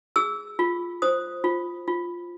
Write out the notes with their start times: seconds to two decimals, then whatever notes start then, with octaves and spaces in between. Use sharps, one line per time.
0.16 G#4 E6
0.59 F4
1.02 C5 D#6
1.44 F4
1.88 F4